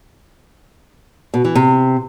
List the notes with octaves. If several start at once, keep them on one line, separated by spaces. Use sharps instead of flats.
B2
E3
C3